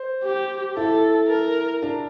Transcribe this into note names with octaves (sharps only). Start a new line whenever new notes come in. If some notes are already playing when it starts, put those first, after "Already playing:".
Already playing: C5
G4
E4 A4
A#4
D4